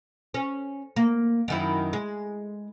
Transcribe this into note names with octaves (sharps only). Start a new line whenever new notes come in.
C#4
A#3
F#2 D#3 E4
G#3